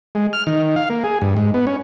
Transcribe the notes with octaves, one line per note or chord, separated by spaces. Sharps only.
G#3
F6
D#3
F5
A#3
G#4
G2
G#2
B3
C#4